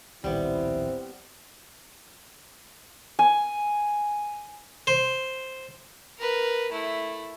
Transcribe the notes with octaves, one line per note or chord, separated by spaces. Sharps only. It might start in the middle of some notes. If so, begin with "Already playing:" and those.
D1 A#1 D#3 G3 B3 C4 E4
G#5
C5
A#4 B4
A3 E4